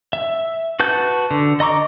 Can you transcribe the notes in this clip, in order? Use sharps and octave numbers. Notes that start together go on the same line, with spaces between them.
E5
F#4 B4 A5 G6
D3
D#5 A#5 C#6 D6